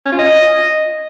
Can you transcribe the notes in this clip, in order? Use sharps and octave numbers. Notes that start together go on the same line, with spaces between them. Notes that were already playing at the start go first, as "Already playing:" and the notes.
C#4
F4
D#5